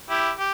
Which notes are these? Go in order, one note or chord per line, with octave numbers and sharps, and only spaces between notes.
E4 G4
G4